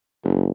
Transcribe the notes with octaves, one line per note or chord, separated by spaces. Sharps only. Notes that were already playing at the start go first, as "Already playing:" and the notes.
F#1